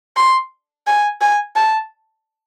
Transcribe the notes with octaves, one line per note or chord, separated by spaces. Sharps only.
C6
G#5
G#5
A5